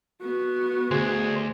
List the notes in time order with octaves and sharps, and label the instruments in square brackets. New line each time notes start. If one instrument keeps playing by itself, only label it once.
[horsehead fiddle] B3 F#4
[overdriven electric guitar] D2 [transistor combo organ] G#4 C5